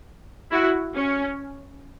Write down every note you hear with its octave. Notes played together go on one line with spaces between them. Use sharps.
E4 F#4
C#4